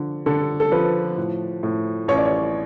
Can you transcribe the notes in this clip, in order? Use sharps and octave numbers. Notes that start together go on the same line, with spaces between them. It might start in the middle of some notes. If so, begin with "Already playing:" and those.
Already playing: D3 F3
D3 A4
A4
F3 B4
A2
A2
A1 C#5
D5
C#5